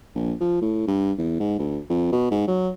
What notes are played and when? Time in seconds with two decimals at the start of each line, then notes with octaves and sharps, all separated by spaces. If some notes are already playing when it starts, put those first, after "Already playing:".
0.15 A#1
0.40 F3
0.61 A2
0.87 G2
1.18 E2
1.40 G#2
1.59 D2
1.90 F2
2.12 B2
2.31 G#2
2.47 F#3